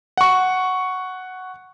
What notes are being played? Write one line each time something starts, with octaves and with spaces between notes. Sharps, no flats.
F#5 C#6